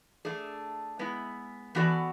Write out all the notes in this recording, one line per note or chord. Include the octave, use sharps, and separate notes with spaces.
A3 D4 G#4
G#3 B3 E4
E3 B3 F#4 A4 D5